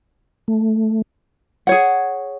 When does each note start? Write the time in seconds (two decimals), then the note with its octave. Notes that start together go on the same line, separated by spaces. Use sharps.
0.48 A3
1.67 G#4 C#5 F#5